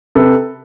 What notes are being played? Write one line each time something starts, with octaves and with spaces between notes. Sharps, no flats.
C3 A4 B4